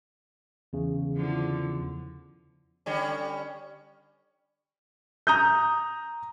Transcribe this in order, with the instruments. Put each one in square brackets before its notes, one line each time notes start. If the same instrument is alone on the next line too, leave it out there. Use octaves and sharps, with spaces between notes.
[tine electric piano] E2 C#3
[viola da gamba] D3 F3 E4
[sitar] D3 G3 C#4
[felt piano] A#5 D#6 G6